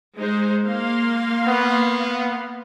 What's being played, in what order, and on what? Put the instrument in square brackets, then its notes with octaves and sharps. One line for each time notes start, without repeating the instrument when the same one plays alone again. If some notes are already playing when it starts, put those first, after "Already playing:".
[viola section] G#3 D#4 C5
A#3 F5 C6
[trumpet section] B3